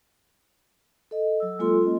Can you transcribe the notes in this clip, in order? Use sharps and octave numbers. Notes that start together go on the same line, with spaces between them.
A4 D#5
F#3 E6
G#3 A#3 F4 A4 C6
C#4 D#5